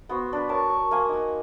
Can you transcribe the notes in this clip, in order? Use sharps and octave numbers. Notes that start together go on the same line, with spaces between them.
B3 F#4 C5
D4 B4
A#4 C#5 A5
C#6
A#3 C5 G#5
D#4 F#5